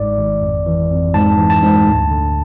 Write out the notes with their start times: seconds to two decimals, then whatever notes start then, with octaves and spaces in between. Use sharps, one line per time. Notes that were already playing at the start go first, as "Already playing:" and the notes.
Already playing: G#1 G#2 D5
0.17 G#1
0.42 F2
0.66 E3
0.90 F2
1.14 G#2 A5
1.37 E3
1.50 A5
1.62 G#2
1.86 D2
2.11 D3